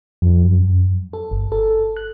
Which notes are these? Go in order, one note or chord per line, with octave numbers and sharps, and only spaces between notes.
F2
F#2
A4
G1
A4
F#6